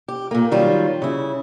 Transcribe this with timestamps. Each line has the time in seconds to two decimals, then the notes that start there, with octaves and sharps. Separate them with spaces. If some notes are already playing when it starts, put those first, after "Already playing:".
0.08 G4
0.31 A#2 A#3
0.51 D#3 F#3 G3 F4
1.02 C#3 E4